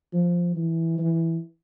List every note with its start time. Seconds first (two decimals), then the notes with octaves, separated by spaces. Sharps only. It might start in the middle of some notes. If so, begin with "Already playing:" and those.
0.13 F3
0.56 E3
0.98 E3